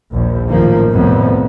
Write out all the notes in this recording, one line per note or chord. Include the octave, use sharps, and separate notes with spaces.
A#1 D#2
A1 F#2 D#3 F3 A#3
C2 F2 A2 C3 B3